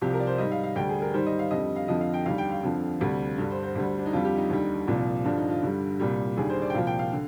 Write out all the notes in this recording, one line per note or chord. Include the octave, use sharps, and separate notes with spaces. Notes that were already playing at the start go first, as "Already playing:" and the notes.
C2 C3 F3 G4
A#4
D5
C5
G#2 G3 D#5
F5
F5
D2 D3 G3 G5
G#4
A#4
G#2 D#3 G3 C5
D#5
F5
F2 D3 G3 D#5
F5
F2 D3 F3 D#5
F5
G5
D#2 D3 G3 F5
G5
F5
F2 D3 F3
D2 C3 G3
G2 D3 G3
C5
C5
D2 D3 G3
D4
D#4
F2 D3 G3 F4
G4
D#4
D#2 D3 G3
C2 A#2 F3
G2 D3 F3 D4
D#4
F4
G2 D3 G3
C2 A#2 G3
D#2 D3 G3 G#4
C5
D5
G5
C2 A#2 F3 F5
G5
F5
D3